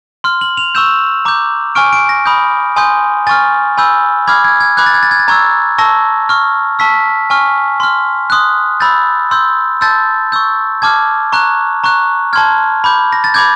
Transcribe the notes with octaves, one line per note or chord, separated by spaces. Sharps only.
C6 F6
F#7
F7
C#6 E6 G6 E7
A#5 D6 G6
G#5 C#6 F6 D7
D7
A#6
B5 D#6 G6
G#5 C6 D#6 G6
G#5 C#6 F6 A6
G#5 B5 E6 G6
B5 D6 F6 G#6
G#6
G#6
B5 D6 F#6 G#6
A6
G#6
A6
G#6
A6
A#5 C#6 E6 G#6
A5 C#6 E6 A#6
C#6 F6
A5 C#6 E6 B6
G#5 C#6 F6
C6 F6
C6 D#6 F#6
B5 E6 G6 A6
C6 E6 G6
A5 C6 E6 G6 A6
C#6 E6 G6
A5 D6 F6 G#6
A#5 C#6 F#6
A#5 C#6 F#6
A5 C6 F6 G#6
B5 D6 G6
A#6
A6
B5 D6 G6 G#6